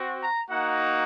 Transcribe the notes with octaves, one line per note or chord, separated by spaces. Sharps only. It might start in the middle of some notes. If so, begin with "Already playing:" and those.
Already playing: C4 F#4
A#5
A#3 D#4 F#4 F#5